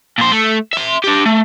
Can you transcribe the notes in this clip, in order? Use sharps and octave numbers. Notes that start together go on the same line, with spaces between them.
A#2 C5
A3
E5 C6
D4 G4
A3